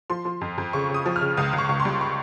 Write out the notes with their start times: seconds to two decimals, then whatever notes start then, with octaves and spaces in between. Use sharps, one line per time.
0.10 F3 C6
0.25 F3
0.41 F2
0.58 F2
0.73 C#3 C#6
0.90 C#3 D#6
1.06 F3
1.16 F6
1.21 C#3
1.37 C#2 D#6
1.53 C#2
1.58 C#6
1.69 C#2
1.80 C6
1.85 G3
2.01 C#6